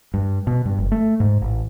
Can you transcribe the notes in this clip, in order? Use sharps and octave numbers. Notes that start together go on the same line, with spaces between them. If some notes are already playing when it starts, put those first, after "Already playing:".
G2
B2
G2
F#1
A3
G#2
A1